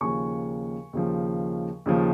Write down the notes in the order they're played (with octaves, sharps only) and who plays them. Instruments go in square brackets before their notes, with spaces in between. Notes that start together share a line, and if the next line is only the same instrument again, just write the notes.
[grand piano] D#2 C#3 F3 G#5 C#6
D#2 C#3 F3
D#2 C#3 F3